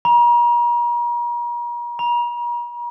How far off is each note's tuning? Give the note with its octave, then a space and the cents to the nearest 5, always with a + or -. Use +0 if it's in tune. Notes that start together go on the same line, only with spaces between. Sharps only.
A#5 +40
A#5 +45